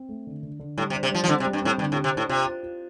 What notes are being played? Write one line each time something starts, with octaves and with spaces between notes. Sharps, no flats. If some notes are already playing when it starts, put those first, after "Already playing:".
Already playing: C4
A3
D3
D3
D3
A2 G3
C3
D4
C3
F3 G3
F3
D3 C4
C3
G3
G2
A2 C4
G2 D3
A2
G4
C3
A2 D4
C3 F4
F4
F4